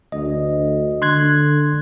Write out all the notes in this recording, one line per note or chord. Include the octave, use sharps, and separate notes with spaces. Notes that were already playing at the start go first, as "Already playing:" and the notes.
D2 D#5
D3 C6 F#6 G#6